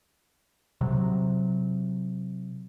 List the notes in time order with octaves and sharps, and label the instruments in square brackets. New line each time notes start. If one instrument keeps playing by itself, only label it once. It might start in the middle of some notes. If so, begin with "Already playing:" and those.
[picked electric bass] C3 F#3